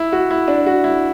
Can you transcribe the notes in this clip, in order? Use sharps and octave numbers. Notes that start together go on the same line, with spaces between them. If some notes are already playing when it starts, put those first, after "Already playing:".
Already playing: E4
F#4
E4
D4
F#4
E4